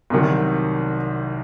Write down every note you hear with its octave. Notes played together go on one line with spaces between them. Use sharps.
C2 C3 D#3 F#3